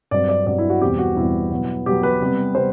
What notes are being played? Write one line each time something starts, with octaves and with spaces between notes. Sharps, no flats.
G2 F#3 C4 D5
D5
G2 F#3 C4 D5
E4
F#4
E2 B2 G3 C4 G4
F#4
E2 B2 G3 C4 E4
B2 F#3 B3
B2 F#3 B3 G4
B4
C3 G3 B3
C3 G3 B3 C5